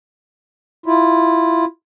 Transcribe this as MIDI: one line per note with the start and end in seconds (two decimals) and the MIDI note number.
0.86 1.65 64
0.86 1.65 65